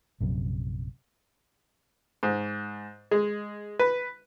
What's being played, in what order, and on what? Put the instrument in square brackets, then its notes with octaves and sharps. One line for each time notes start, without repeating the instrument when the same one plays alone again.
[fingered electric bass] A#1 F#2 C3
[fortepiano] G#2
G#3
B4